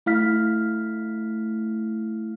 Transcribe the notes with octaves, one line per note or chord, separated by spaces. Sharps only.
A3 E4 F5 F6 B6